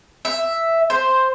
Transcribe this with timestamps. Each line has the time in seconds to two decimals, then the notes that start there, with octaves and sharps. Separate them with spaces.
0.25 E5
0.90 C5